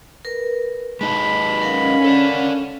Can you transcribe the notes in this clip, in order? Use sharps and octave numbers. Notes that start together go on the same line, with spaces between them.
A#4 B4
G#3 D#4 B4 A5 B5
C#4 A#4 F5 F#5
A4 D5